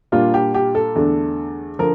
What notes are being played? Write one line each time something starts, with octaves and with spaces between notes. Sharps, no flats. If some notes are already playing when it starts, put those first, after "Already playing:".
A#2 G3 A#3 D4 F4
G4
G4
A4
E2 D3 A3 D4
D3 F3 A#4